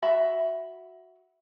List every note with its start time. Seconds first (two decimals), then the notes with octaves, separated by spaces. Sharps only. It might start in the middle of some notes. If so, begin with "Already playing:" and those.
0.02 F#4 E5 B5